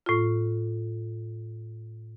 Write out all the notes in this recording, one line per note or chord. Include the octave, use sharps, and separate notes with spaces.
A2 F4